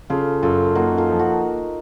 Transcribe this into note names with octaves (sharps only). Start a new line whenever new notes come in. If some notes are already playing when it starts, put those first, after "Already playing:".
C#3 F4 A4
F#2 F4 A4
A#3 D#4 F#4
F4 A4
F3
F#4 A#4